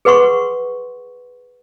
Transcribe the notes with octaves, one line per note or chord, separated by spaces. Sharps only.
G#4 B4 F#5 C6 C#6